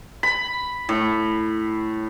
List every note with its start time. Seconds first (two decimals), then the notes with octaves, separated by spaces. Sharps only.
0.23 B5
0.89 A2